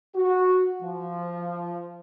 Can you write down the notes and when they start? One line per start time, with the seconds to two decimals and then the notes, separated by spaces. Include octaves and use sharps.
0.15 F#4
0.82 F3